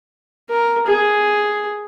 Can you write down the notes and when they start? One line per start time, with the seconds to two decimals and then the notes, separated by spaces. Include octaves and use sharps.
0.50 A#4
0.87 G#4